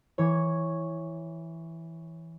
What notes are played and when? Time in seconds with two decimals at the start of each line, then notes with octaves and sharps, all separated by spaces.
0.18 E3 C#5